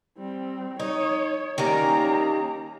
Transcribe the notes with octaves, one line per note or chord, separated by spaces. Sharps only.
G3 C4
D#4 C#5
D#3 G3 A#3 C#4 A#5